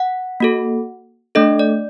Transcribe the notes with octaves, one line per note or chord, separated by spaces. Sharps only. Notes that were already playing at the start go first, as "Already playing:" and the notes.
Already playing: F#5
A#3 F#4 A4
A3 D4 A4 D#5
D5